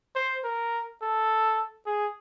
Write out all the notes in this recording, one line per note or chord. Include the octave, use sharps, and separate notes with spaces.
C5
A#4
A4
G#4